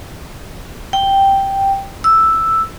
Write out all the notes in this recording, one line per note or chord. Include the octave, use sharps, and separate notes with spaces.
G5
E6